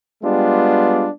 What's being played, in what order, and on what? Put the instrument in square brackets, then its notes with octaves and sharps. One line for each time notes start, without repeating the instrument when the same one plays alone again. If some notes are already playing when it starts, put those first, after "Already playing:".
[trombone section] G3 G#3 B3 D4 F4 G4